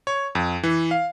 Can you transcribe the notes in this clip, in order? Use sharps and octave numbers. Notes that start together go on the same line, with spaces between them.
C#5
F2
E3
F5